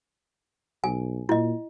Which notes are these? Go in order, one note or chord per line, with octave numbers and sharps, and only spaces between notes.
B1 G#5
A#2 E4 D#5